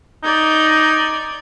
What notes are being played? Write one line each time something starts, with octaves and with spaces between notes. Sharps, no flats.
D#4 D5 G6 G#6